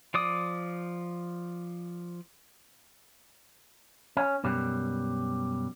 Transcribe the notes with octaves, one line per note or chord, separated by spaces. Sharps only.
F3 D5 D6 D#6
C#4
F#2 B2 G3